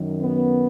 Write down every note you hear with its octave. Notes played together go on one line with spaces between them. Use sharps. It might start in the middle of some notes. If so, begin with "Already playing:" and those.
Already playing: F#2 D#3
B3